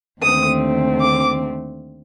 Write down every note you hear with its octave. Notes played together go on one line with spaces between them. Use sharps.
D#2 D3 A3 C4 D#6
D6